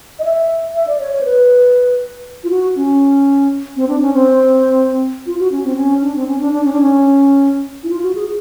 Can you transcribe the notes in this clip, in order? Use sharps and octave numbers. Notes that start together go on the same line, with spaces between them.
D#5
E5
E5
D5
C#5
C#5
C5
B4
F4
F#4
C#4
C4
D4
C#4
C4
F4
F#4
C#4
C4
C#4
D4
C4
C#4
D4
D4
C#4
D4
C#4
E4
F4
F#4
G#4